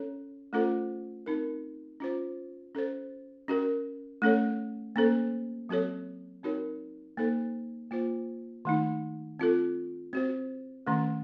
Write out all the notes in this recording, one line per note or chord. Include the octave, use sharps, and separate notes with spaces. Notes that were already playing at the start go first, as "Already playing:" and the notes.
Already playing: C#4 A4 C#5
A3 C#4 F4 A4 C5
C4 D#4 A#4
C#4 F4 C5
C#4 A4 C5
C#4 F#4 A#4
A3 C#4 A4 C#5
A#3 C#4 A4 C5
F#3 C4 F#4 A4 C#5
C4 D#4 F#4 A#4 C#5
A#3 D#4 A4 C5
A#3 F4 C5
D#3 A3 D#4
C4 F4 A4
C4 F#4 C5
D#3 A3 C#4